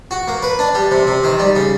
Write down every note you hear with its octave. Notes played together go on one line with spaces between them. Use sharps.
F#4
A#3
B4
D4
G3
C3
C3
D#3
G3
C#3